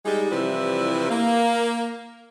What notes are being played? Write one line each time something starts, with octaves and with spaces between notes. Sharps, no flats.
G3 G#3 D#4
C3 E3 F3 G3 E4 B4
A#3